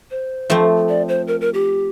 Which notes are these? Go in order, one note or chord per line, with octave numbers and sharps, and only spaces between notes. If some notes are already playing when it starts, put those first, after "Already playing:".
C5
F3 A3 C4
D5
C5
A#4
A#4
G4